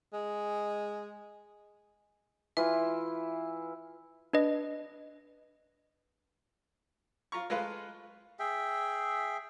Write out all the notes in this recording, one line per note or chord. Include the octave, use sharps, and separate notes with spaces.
G#3
E3 E4 F4 E5
D4 B4 D#5
F4 A#5 C#6
G#3 F4 A4 B4 F5
G#4 E5 G5